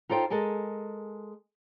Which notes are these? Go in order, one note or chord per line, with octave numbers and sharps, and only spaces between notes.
D#4 F4 A4 C5 G5
G#3 A4 A#4 G#5